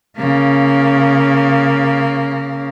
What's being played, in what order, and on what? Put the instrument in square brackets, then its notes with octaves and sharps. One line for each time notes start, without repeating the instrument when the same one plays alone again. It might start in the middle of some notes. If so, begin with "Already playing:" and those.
[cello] C#3 A#3